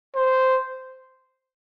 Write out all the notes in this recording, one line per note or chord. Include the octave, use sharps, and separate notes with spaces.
C5